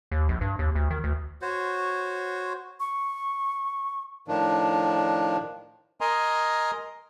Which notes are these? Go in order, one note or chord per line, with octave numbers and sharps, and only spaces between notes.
D#2
A#1
G2
D#2
D2
D#3
D2
F#4 C5 C#5
C#6
A2 D#3 F3 D4
A#4 D#5 G#5 A#5 C6